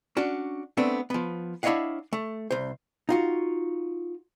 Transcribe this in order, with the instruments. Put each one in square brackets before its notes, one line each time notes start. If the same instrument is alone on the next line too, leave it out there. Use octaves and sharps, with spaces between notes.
[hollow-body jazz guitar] C#4 D4 F#4
A3 B3 C4 D4
F3 B3
D4 E4 C#5 D#5 F5 F#5
A3
C2 C5
D#4 F4 F#4